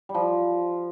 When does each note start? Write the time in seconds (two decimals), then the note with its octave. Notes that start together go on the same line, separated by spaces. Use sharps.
0.09 G3
0.14 F3